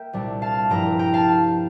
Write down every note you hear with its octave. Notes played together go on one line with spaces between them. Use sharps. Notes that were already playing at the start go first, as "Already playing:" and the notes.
Already playing: A#3 E5 G5
C2 A#2 G3 D4
F5 A5
G2 F3 A#3 E4 G5 A#5
G5 A#5
F5 A5